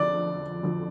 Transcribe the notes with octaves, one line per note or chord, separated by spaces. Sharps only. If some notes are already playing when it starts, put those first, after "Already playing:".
Already playing: F2 D3 F3 D5
F2 D3 F3